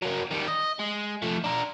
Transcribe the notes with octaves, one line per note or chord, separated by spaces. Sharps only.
F#3 A#3
D#3 G3
D#5
G#3
F3 A3
D4 A#4